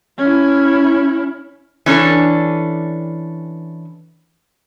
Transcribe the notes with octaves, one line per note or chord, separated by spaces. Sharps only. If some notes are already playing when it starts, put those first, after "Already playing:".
C#4 E4
E3 C#4 D4 A4